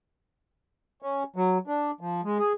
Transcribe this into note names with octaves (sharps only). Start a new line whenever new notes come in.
C#4
F#3
D4
F3
G#3
G#4